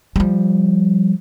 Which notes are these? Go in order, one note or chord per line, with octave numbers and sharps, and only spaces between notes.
F3 G3